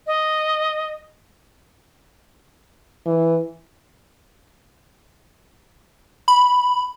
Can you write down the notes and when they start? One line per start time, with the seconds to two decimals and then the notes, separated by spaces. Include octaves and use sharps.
0.07 D#5
3.06 E3
6.28 B5